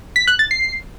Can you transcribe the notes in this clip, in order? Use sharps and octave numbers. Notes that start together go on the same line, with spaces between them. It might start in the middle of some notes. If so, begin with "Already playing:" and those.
B6
F#6
A6
C7